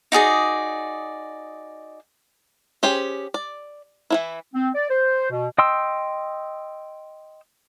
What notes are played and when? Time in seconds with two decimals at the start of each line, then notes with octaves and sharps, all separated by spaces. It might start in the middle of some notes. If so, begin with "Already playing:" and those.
0.12 D#4 F#4 G#4 D5
2.83 C#4 G4 G#4 C5
3.34 D5
4.10 E3 F3 E4
4.54 C4
4.74 D5
4.90 C5
5.30 B2
5.58 D#5 G5 C6 E6